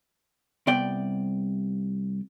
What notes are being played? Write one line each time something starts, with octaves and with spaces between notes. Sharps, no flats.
C2 B3 D5 G5